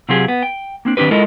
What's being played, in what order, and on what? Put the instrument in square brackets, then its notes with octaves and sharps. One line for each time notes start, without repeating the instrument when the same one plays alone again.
[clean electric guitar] C3 F#3 C4 F4 G4 G#4
B3
G5
A#3 C4 D4
D#3 C4 D4 G4 B4
G#3 E4 F4 A4 A#4 D#5